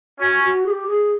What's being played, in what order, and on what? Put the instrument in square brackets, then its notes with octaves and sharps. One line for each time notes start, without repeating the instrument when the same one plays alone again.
[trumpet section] C#4 [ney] F#4
[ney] F#4
G#4
G4
G#4